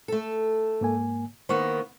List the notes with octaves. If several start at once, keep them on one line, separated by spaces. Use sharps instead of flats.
A3 A4
G#2 A#3 G#5
D#3 A#3 B3 C5 C#6